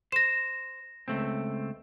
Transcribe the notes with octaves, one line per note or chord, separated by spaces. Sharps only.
C5 A#6 E7
C#2 A3 C4